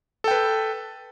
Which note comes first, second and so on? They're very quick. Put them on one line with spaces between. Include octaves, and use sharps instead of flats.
A4 G5 B4